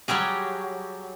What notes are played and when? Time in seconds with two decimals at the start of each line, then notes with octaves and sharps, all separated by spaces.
0.08 F#3 G3 G4 G#4